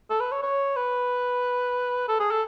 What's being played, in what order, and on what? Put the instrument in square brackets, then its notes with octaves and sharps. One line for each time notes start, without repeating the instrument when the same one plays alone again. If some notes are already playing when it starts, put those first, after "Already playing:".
[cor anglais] A4
B4
C#5
C#5
B4
A4
G#4
A4